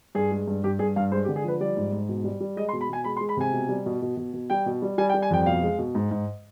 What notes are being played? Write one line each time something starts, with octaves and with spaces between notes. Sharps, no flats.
G2 G#4
G#3
G2
G2 G4
G2 G#4
G2 F5
G#3 C5
G4
D3
G#4
F3 B4
G3 D5
G#2
G#2
B2
G3
G3
G#3 D#5
C6
B2
B5
B2 G#5
G#3 B5
C6
G#3
B5
C3 G#5
B2
G3
B2
B2
B2
B2
G3 G5
B2
G3
G3 G#5
G5
G3
G#5
F2 G5
G5
B2 F5
G#3
B2
G#2
G#2